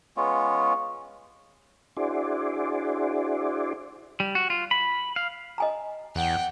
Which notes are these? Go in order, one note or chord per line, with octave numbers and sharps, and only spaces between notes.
G#3 B3 C#4 F4
D4 E4 F#4 G#4 C5 D5
G3
F#4
F4
B5
F5
D#5 G#5 A#5
E2 F#5 G5